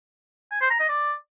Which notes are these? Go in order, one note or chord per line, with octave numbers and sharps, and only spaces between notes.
G#5
C5
A#5
D#5
D5